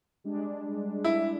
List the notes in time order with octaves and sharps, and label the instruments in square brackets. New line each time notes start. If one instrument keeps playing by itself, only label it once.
[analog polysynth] G3 G#3 D4
[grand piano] E4